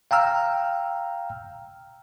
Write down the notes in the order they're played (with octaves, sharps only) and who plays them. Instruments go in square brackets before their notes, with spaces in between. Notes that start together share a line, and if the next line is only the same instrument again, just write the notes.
[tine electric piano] F5 G5 A#5 E6 F6